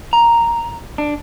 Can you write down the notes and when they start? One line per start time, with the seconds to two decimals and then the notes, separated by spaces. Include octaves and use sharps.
0.13 A#5
0.98 D4